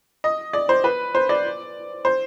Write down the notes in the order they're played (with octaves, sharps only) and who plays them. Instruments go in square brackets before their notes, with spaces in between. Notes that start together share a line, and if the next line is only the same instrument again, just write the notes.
[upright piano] D#5
D5
C5
B4
C5
D5
C5